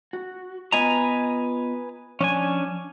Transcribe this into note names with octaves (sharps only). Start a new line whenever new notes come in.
F#4
B3 F4 B4 D#5 G#5 A#5
F3 C#4 D4 G#5